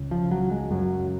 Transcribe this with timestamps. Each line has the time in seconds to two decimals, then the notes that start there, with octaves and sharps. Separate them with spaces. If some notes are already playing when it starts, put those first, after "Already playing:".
Already playing: C#2 C#3
0.11 F3
0.31 F#3
0.51 G#3
0.71 F#2 C#3 F#3